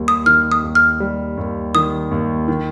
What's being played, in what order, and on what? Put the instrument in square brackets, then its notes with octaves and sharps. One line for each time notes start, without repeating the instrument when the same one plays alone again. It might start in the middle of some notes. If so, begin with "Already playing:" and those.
Already playing: [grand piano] D#2 G3
[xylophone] D#6
[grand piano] D#3 [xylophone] F6
[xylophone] D#6
[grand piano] D#2
[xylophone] F6
[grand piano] G3
D#2
[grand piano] D#3 [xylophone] D#6
[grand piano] D#2
D#3